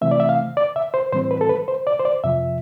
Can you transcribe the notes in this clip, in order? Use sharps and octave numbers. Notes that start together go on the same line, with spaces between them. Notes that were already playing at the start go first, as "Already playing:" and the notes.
C3 E3 A3 C4 E5
D5
E5
F5
D5
E5
C5
A2 E3 G3 C4 C5
B4
A4
B4
C5
D5
C5
D5
F2 C3 F3 E5